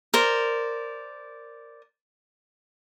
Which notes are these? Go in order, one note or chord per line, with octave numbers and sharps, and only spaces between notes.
A#4 C5 D5